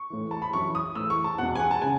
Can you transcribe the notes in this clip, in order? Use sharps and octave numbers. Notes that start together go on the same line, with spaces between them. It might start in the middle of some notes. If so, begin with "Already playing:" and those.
Already playing: C#6
A2 E3
A5
B5
F#2 E3 C#6
D#6
A2 E3 E6
C#6
A5
E2 B2 F#5
G#5
F#5
A5
C#3 G#5